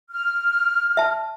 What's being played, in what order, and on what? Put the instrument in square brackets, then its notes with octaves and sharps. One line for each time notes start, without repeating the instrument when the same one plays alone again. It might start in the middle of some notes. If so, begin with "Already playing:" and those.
[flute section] F6
[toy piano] E5 A5